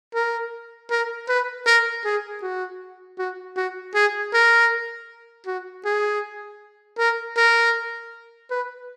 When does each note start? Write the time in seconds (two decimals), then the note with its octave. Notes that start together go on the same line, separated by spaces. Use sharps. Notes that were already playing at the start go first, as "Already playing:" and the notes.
0.15 A#4
0.90 A#4
1.28 B4
1.67 A#4
2.05 G#4
2.42 F#4
3.19 F#4
3.56 F#4
3.94 G#4
4.33 A#4
5.47 F#4
5.85 G#4
6.98 A#4
7.37 A#4
8.51 B4